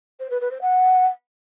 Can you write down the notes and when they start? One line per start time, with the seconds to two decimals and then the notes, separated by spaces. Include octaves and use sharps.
0.20 C5
0.30 B4
0.41 B4
0.51 C5
0.61 F#5